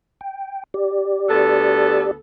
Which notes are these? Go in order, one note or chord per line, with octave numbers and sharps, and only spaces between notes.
G5
G4 D5
D2 B3 A4